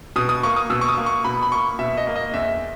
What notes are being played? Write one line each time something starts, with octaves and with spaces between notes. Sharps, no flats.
B2 D#6
D#6
A#3 C#6
D#6
B2 E6
C#6
D#6
A#3
C#6
B2 B5
B5
A#3 C#6
B2 E5
D#5
A#3
D#5
E2 E5